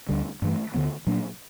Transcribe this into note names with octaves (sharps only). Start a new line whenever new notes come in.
D2 D3 G3
G2 E3 A3
D2 D3 F#3 B3
A#2 F#3 A#3 D4